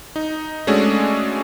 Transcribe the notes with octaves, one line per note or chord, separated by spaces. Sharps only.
D#4
G#3 A3 C#4 D4 F#4 G#4